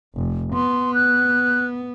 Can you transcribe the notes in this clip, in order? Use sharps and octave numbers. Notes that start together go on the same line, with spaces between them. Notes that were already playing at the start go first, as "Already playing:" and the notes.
F1
B3 C6
F#6